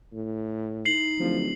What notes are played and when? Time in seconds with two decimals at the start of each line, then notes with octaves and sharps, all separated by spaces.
0.13 A2
0.85 D#4 C7 F#7
1.20 D1 F3